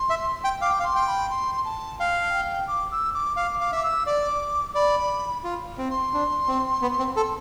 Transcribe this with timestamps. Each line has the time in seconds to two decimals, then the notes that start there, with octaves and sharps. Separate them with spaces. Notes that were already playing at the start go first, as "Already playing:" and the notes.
Already playing: C6
0.10 E5
0.44 G5
0.61 F5 D6
0.70 G5
0.80 F5
0.84 C6
0.95 G5
1.07 B5
1.30 C6
1.65 A5
1.99 F5 G5
2.34 G5
2.68 D6
2.92 E6
3.14 D6
3.37 F5 D6
3.60 F5 D6
3.72 E5 D6
3.83 E6
4.06 D5 D6
4.75 D5 B5
5.44 F4
5.78 C4
5.90 C6
6.14 D4
6.48 C4
6.82 B3
6.99 C4
7.17 A4